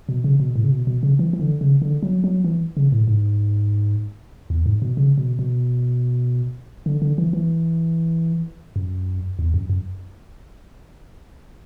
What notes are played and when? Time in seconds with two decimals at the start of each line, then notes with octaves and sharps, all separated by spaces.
0.09 B2
0.24 C#3
0.40 B2
0.56 A2
0.64 C#3
0.72 B2
0.87 B2
1.03 C#3
1.19 E3
1.33 E3
1.40 D3
1.61 C#3
1.82 D3
2.03 F#3
2.24 F#3
2.44 E3
2.77 C#3
2.92 A2
3.08 G#2
4.50 E2
4.66 G#2
4.82 B2
4.97 C#3
5.18 B2
5.39 B2
6.86 D3
7.02 D3
7.18 E3
7.33 E3
8.76 F#2
9.39 E2
9.54 F#2
9.69 F#2